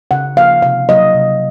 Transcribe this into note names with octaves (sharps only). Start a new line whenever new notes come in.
C#3 F#5
F3 A#3 F5
C3 F5
F#3 A#3 D#5
C3